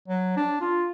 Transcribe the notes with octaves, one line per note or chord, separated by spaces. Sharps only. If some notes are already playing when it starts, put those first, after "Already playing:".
F#3
D4
F4